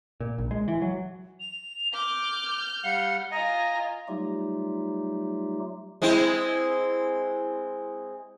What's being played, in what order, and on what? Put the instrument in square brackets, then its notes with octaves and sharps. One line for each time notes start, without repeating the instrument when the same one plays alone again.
[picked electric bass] A#2
A#1
G#3
E3
F#3
[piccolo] F7
[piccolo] D6 [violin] F6 G6
[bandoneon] G3 F5 F#5 [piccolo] C#7
[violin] F4 G#5 [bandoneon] D#5 [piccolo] A#5
[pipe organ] F#3 G3 A3 D#4 F4 G4
[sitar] G#3 C4 E4